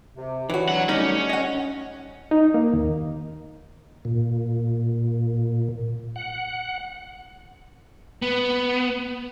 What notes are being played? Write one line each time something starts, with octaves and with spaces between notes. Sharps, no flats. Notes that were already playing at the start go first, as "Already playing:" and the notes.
C3
E3 D4 F#4 C#5
F#3 F#5
G3 A3 C#4 D#4
D#5 F#5
D#4
A#3
D#2
A#2
F#5
B3